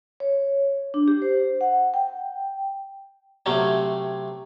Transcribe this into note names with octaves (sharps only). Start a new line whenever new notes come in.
C#5
D4
G4
C5
F#5
G5
C3 F#3 A3 C4 C#4